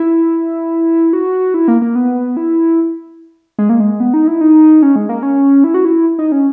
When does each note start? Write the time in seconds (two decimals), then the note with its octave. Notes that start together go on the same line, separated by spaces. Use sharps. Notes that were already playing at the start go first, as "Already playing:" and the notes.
Already playing: E4
1.13 F#4
1.54 E4
1.68 A#3
1.82 A#3
1.95 B3
2.37 E4
3.59 G#3
3.69 A#3
3.80 G#3
4.00 B3
4.14 D#4
4.27 E4
4.41 D#4
4.82 C#4
4.96 G#3
5.09 A#3
5.23 C#4
5.64 E4
5.74 F#4
5.85 E4
6.19 D#4
6.32 C#4